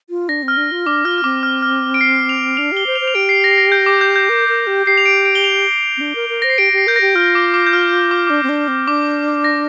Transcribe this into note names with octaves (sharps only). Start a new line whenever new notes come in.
F4
D4 A#6
C4
F6
D4
F4
D4 D6
F4 F6
F6
C4 D6
F6
F6
D7
C7
F7
D4 F7
G4 G7
C5
F7
C5
F7
G4 D7
C7
A#6
C7
A#6
G6
D6
G6
G6
A#4
A#4
G4
G4 C7
F7
D7
D7
G7
F7
C4
D4
A#4
A#4
C5 A#6
C7
G4 D7
G4 C7
A#4 G6
A#6
G4
F4 F6
D6
D6
G6
F6
D6
D4 D6
C4
D4
C4
D4 D6
A#6